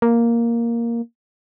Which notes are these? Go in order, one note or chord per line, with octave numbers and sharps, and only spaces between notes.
A#3